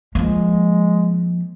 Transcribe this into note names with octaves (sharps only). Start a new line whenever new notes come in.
F3 G#3 A#3